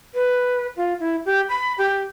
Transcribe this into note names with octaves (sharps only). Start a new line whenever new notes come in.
B4
F4
E4
G4
B5
G4